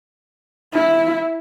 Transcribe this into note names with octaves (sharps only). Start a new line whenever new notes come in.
E4